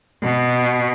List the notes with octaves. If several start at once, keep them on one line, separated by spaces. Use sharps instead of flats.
B2